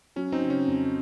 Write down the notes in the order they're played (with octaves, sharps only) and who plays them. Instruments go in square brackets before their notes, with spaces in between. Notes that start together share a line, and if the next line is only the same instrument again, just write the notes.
[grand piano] F#3 [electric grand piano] C#4
[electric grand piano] C4 D#4
[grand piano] C#3
[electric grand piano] C#4
[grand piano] F2